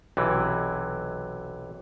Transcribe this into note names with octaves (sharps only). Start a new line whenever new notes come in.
B1 C3 E3